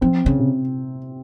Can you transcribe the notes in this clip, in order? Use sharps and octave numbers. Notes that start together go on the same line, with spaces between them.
F3 C4
C#3
C3